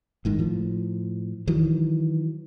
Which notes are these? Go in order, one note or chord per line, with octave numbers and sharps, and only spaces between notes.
G1 G#2 D#3
A2 F3
D#3 E3 F#3